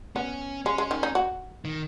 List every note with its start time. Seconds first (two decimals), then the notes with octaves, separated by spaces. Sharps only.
0.16 B3 C#4
0.65 G#3 C#4
0.78 G#3
0.91 D#3
1.03 D#4
1.15 F#4
1.65 D#3